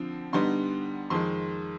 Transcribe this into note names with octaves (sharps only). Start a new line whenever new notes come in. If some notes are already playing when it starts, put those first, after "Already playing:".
Already playing: D3 F3 C4
D3 G3 B3 D#4 C6
F2 D#3 G#3 C6